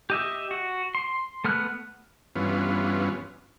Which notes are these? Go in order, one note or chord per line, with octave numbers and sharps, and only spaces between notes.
G4 D#5 E5
F#4
C6
A3 B3 F6 F#6
G2 E3 B3 C#4 F4